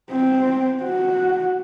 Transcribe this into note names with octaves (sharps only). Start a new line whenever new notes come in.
C4
F#4